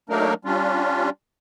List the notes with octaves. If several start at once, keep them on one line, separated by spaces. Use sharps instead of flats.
F#3 A3 A#3 D4 D#4 A#4
G3 C#4 D4 F4